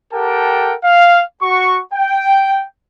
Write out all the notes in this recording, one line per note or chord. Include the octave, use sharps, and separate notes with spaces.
G4 A4 A#4 F#5 G5 A5
F5
F#4 C#6
G5